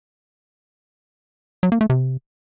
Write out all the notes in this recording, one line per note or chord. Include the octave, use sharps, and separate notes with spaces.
F#3
A#3
A3
C3